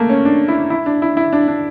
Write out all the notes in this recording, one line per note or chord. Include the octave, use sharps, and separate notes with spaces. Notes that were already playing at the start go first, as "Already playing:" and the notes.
Already playing: A3 A#3
C#4
D4
E4
E4
D4
E4
E4
D4
D4